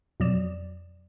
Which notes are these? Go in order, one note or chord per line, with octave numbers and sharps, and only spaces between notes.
F2 B2 F#3 D5 D#6 E7